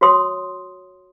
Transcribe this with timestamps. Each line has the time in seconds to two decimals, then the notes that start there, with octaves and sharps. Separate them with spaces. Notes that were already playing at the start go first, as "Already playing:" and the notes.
0.01 F#4 C#5 C6 D#6